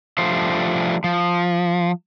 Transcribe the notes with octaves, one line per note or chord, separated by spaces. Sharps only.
F3 G3 A3 D4 C5
F3